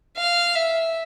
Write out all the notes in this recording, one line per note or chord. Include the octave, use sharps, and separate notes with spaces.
F5
E5